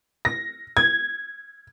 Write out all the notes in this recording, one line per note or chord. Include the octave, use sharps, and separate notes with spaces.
A#6
G#6